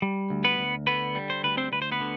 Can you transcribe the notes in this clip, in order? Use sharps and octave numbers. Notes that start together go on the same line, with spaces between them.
G3
D2
B3 B4
D2
D3 B3 B4
G3
C5
D2 B4
C4 C5
D2 B4
C5
B3 B4
D3